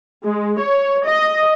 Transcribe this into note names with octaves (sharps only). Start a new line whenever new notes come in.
G#3
C#5
D#5